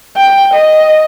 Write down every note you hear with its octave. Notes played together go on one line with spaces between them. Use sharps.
G5
D#5